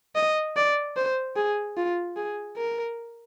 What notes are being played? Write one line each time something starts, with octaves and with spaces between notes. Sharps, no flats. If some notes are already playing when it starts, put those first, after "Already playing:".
D#5
D5
C5
G#4
F4
G#4
A#4